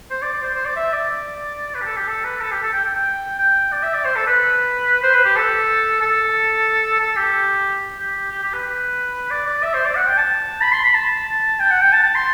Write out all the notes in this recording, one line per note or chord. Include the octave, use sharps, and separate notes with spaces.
C5
D5
D5
C5
C5
D5
E5
D5
B4
G4
A4
G4
A4
B4
A4
G4
A4
G5
G5
G5
G5
D5
E5
D5
C5
A4
B4
C5
B4
G4
A4
A4
A4
G4
G4
G4
G4
B4
D5
D5
E5
C5
D5
F#5
G5
A5
B5
C6
B5
A5
G5
F#5
G5
A5
A5
C6